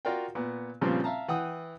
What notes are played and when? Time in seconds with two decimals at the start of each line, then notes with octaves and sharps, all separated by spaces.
0.05 F4 F#4 A#4 D5 F5 G5
0.35 A#2 B3
0.81 A#2 C#3 F3 G3 B3 C4
1.04 E5 F5 A5 A#5
1.28 E3 F#5 G5 D#6